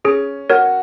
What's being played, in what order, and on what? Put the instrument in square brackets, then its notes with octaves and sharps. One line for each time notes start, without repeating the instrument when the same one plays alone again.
[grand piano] C#4 [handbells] G#4
[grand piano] F#4 [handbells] A#4 C#5